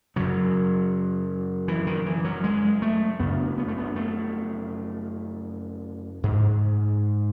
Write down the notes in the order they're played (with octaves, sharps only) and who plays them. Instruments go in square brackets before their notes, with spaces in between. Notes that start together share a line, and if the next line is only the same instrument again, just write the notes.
[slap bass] F#2 C#3 F#3
E3
D#3
E3
F#3
G#3
A3
F#2 C#3 B3
B3
A3
B3
A3
G#2